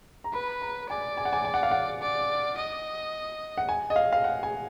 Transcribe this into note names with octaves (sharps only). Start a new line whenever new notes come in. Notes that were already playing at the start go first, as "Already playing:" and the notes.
A#5
B4 B5
A#5
D5 G#5
G#5
F#5
G#5
G#5
F#5
F5
F#5
D5
D#5
F#5
G#5
D#5
F5
F5
F#5
G#5